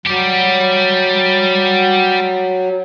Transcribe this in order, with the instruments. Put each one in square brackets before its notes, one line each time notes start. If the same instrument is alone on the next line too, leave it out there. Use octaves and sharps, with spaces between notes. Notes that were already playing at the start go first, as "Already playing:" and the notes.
[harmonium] F#3 [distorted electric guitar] G3 G4